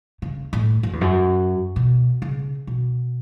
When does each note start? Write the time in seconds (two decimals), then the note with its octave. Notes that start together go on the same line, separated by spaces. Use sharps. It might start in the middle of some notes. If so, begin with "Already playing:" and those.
0.22 C#3
0.53 A2
0.83 F#2
0.93 E2
1.01 F#2
1.76 B2
2.22 C#3
2.67 B2